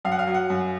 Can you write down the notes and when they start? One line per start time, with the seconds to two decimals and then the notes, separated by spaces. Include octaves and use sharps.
0.05 F#2 F5
0.12 F#5
0.19 F5
0.27 F#3
0.34 F#5
0.50 F#2